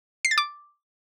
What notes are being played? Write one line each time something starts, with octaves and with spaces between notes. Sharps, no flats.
C7
A6
D6